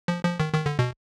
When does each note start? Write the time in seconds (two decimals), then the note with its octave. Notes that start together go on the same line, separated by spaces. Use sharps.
0.08 F3
0.24 F3
0.40 D#3
0.54 D#3
0.66 D3
0.79 B2